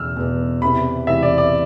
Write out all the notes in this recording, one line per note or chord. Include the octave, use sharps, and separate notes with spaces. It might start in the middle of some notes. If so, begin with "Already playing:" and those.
Already playing: E2 B2 E6 F6
E2 B2
E2 C3 E3 B5
E2 C3 E3 E5
D5
D5